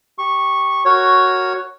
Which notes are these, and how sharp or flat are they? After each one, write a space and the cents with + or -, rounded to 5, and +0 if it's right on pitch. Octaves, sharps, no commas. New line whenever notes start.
G4 +0 C#6 -10
F#4 +0 A#4 -10 C#5 +0